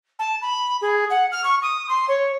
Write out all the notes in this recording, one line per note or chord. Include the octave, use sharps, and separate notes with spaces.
A5
B5
G#4
F#5
F6
C#6
D#6
C6
C#5